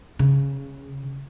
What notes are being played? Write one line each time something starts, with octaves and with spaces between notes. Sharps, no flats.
C#3